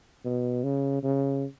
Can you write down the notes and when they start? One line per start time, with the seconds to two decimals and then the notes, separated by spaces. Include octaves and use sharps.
0.25 B2
0.64 C#3
1.03 C#3